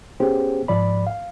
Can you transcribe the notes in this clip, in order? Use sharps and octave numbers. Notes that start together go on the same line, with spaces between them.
B3 C#4 G4 G#4 C5
G#2 F3 D5 B5
F5